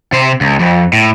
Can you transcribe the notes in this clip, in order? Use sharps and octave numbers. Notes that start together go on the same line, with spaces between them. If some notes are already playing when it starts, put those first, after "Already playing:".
C3 C5
C#2
F2
A2